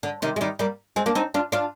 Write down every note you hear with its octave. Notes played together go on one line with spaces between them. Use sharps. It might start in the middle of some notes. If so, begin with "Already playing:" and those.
D3
C3 D#3
G#3
D#3 G3
G3 A#3
G#3 C4
A#3 D4
C4 D#4
D4 F4
D4 F4